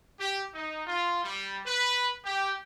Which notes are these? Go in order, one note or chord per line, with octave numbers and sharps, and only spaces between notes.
G4
D#4
F4
G3
B4
G4